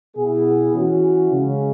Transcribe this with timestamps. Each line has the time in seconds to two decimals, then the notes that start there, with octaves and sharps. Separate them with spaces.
0.16 B2 B3 E4 G#4
0.75 E3 C#4 F#4
1.32 C#3 G#3 C#4